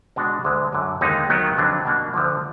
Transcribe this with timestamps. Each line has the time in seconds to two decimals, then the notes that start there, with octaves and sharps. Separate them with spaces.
0.16 B2 G#3 D4 F#4
0.44 D2 D3 G#3
0.73 F#2 D3 F#3
1.01 D#2 D3 G#3 B3 D#4
1.30 D#2 D#3 F#3 B3
1.57 F2 D3 F#3 D4
1.85 B2 A#3 D4 F#4
2.14 D2 D3 F3